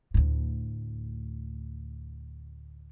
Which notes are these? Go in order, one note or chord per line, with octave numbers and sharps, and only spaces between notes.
D2 A2